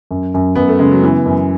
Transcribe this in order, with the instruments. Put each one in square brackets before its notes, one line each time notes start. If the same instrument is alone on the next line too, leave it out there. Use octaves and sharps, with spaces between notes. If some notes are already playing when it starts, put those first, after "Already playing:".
[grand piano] F#2
F#2
[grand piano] F#2 [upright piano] B3
[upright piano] A3
[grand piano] C#3 [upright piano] G#3
[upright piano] F#3
[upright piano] E3 [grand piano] B3
[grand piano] F#2